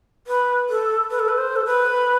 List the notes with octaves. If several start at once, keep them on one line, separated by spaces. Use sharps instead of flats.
B4
A4
B4
A4
B4
C5
A4
B4